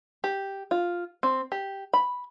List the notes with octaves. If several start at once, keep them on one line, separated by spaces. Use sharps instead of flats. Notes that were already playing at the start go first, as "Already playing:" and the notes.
G4
F4
C4
G4
B5